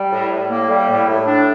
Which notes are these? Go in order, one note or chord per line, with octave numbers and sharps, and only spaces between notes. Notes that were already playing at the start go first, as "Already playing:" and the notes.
Already playing: G3
A2
A2
A#3
G3
A2
A2
D4